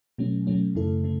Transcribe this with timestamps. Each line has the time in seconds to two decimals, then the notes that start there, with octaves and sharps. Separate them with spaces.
0.18 B2 F#3 A3 C#4
0.47 B2 F#3 A3 C#4
0.75 F#2 C#3 A3 E4 A4
1.04 C#3 A3